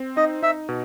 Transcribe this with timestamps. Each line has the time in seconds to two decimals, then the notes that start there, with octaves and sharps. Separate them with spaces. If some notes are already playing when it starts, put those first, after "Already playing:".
Already playing: C4
0.17 D#4 D#5
0.42 D#4 E5
0.69 B2